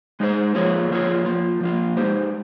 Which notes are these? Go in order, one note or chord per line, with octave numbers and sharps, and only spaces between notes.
G#3 D#4 G#4 C5
F3 A#3 F4 G#4 C#5
F3 A#3 F4 G#4 C#5
F3 A#3 F4
F3 A#3 F4
G#3 D#4 G4 C5